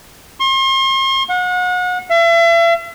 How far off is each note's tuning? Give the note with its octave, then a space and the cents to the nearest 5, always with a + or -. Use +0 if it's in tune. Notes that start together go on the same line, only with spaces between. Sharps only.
C6 +40
F#5 -35
E5 +40